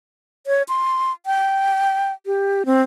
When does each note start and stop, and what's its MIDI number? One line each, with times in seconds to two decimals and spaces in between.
0.47 0.63 73
0.69 1.12 84
1.26 2.13 79
2.26 2.66 67
2.66 2.82 60